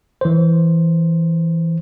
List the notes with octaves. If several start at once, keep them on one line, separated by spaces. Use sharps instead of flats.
E3 C5